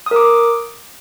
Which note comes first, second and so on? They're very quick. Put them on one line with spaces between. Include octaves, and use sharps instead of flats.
D#6 A#4 D6